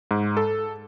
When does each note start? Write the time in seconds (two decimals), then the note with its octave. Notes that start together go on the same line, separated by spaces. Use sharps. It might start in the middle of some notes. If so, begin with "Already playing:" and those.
0.11 G#2
0.37 A4